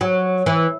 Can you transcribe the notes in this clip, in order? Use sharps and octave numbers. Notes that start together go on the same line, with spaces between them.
F#3
E3